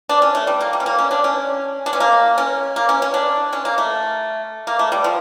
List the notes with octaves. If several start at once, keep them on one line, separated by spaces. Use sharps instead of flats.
D4
C#4
A3
G3
A#3
G3
C#4
A#3
C#4
D4
C#4
D4
C#4
A#3
C#4
A#3
C#4
C#4
D4
C#4
A#3
A3
A#3
A3
G3
F3